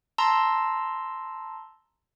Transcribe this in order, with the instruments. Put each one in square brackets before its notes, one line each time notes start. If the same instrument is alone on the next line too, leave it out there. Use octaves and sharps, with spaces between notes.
[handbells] A5 A#5 C6 E6